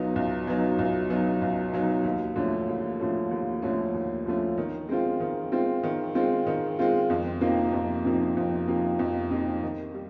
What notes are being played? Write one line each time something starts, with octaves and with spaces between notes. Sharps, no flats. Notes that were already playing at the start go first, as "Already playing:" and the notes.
Already playing: C#2 B2 F#3 B3 D#4
C#2
B2 F#3 B3 D#4
C#2
B2 F#3 B3 D#4
C#2
B2 F#3 B3 D#4
D#2
D3 F3 A3 C#4
D#2
D3 F3 A3 C#4
D#2
D3 F3 A3 C#4
D#2
D3 F3 A3 C#4
D#3
G#3 C4 F4
D#3
G#3 C4 F4
D#3
G#3 C4 F4
D#3
G#3 C4 F4
F2
C3 F3 A#3 D#4
F2
C3 F3 A#3 D#4
F2
C3 F3 A#3 D#4
F2
C3 F3 A#3 D#4
D#3
G3